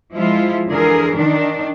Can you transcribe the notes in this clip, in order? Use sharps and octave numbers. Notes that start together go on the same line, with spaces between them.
F3 G#3 E4 F4
D3 E3 G#4 A#4
D#3 D4